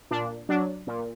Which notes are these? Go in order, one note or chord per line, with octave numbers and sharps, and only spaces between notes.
A#2 D4
F#3 D4
A#2